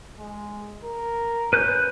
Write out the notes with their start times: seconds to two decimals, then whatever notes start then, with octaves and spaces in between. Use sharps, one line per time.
0.19 G#3
0.84 A#4
1.53 C#4 B4 F#6 G6